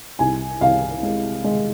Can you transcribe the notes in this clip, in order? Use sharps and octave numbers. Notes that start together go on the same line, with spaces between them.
C2 G#5
C2 F5
G#3
G#3